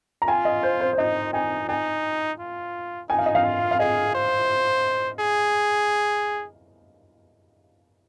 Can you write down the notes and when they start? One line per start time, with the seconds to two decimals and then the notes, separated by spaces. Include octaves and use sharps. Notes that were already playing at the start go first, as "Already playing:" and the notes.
0.22 A#5
0.28 F4 G#5
0.45 D#5
0.63 C5
0.81 C5
0.93 C5
0.98 D#4 D#5
1.33 D#4 G#5
1.69 D#4 G#5
2.39 F4
3.09 D#4 G#5
3.18 F5
3.26 D#5
3.35 F5
3.44 F4
3.71 F5
3.79 G#4 D#5
4.15 C5
5.20 G#4